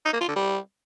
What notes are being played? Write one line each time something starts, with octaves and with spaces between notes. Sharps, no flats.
D#4
A#3
F4
D3
G3